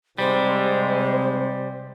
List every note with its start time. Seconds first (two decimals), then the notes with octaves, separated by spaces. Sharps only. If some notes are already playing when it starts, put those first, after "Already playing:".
0.18 G#2 C3 G3 G#3 C4 C5